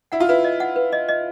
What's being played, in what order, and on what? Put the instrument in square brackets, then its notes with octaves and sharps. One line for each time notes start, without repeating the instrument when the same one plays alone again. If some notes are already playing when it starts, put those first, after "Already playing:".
[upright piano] E4 [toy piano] F#5
[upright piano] F4
[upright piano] E4 [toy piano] B4
[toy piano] D#5
F#5
B4
D#5
D#5